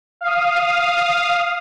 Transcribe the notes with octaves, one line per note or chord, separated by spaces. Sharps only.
F5 D#6